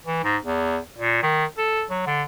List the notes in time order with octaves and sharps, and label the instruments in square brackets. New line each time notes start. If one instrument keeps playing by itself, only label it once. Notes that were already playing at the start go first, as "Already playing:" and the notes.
[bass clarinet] E3
G#2
E2
A#2
D#3
A4
F#3
D3